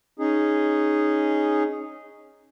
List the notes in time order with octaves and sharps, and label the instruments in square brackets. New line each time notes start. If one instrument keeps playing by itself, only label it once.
[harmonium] C#4 D#4 G#4